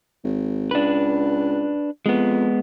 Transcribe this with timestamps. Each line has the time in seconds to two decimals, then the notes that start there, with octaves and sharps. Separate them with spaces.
0.24 G#1
0.71 C#2 D4 B4
2.06 F2 G#3 B3